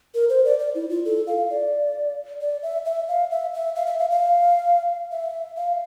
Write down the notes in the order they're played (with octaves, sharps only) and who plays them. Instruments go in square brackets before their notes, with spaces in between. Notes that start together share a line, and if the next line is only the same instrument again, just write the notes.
[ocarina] A#4
C5
D5
D5
E4
F4
A4
F5
D5
D5
E5
E5
F5
E5
E5
F5
E5
F5
F5
E5
F5